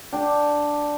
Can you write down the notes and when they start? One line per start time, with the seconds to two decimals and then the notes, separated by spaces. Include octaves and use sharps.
0.13 D4 G5